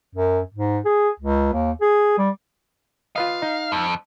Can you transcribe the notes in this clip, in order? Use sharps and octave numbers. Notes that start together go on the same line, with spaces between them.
F#2
G#2
G#4
C#2
D#2
G#4
G3
F4 B4 D#5 F5
D#4
F2